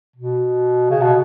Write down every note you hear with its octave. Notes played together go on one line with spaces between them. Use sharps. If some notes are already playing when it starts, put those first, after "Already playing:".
B2
C#3
B2